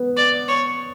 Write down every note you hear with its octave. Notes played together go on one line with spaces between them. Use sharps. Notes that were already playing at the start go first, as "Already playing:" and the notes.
Already playing: B3
D5
C#5